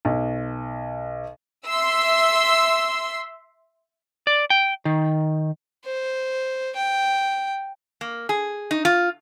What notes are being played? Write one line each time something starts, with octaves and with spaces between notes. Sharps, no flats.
B1
E5 C6 E6
D5
G5
D#3
C5
G5
A#3
G#4
D#4
F4